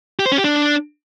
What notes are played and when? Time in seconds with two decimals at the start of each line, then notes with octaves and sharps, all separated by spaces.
0.19 G4
0.26 C5
0.32 C#4
0.38 G4
0.44 D4